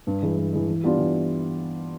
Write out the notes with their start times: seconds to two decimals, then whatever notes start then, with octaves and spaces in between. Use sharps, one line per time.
0.07 G2
0.22 E3 G#3
0.38 G2
0.53 E3 G#3
0.68 E3
0.84 G3 B3 D4 F4
0.99 E3